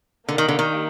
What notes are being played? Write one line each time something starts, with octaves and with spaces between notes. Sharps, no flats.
D3 A#3 D#4 G4
D#3
D3
D#3